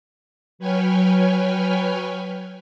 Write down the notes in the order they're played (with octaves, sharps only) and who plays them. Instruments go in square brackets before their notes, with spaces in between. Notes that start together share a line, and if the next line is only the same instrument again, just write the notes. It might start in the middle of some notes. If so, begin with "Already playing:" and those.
[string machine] F#3 B4 C#5 G5 G#5 F6